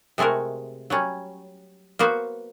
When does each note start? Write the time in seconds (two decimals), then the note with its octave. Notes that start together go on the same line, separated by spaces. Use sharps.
0.18 C3 G#3 A3 F#4 A#4
0.90 F#3 G3 C#4
1.99 A#3 B3 F#4 C5